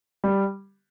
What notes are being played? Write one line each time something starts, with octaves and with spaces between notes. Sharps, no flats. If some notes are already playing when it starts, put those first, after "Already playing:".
G3